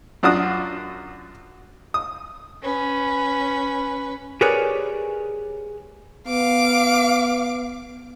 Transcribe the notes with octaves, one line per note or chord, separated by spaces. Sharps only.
F#2 D4 F4 F#4 D#6 F#6
D#6
C#4 B4
G4 G#4 A#4 B4 C#5 D5
B3 F5 D6